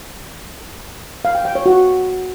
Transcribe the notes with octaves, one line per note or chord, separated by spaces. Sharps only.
F5
G5
G5
C#5
F#4